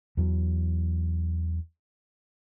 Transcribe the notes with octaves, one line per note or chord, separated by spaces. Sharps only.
E2 E3 F#3